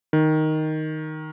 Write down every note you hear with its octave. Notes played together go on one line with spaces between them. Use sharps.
D#3